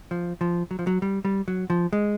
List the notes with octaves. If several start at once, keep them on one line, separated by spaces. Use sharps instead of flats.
F3
F3
F#3
F3
F#3
G3
G3
F#3
F3
G#3